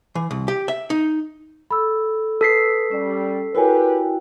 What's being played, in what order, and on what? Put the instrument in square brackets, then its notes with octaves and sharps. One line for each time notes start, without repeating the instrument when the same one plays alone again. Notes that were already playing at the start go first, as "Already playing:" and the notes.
[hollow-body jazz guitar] E3
C2
G4
E5
D#4
[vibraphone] A4 [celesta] B5 E6
[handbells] A4 B6 C7 [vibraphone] B4 D#6
[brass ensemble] G3 [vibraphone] C#4
[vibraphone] E4 F#4 G5 [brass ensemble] G4 B4 [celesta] A#4 C#5 G#5